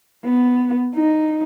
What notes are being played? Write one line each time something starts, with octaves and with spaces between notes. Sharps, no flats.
B3
D#4